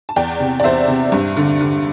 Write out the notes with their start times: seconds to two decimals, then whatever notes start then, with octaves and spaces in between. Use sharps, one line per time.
0.09 A5
0.16 E2 D5 G5
0.40 C3
0.60 D5
0.64 E2 C5 E5
0.88 C3
1.12 G2
1.37 D3
1.61 D3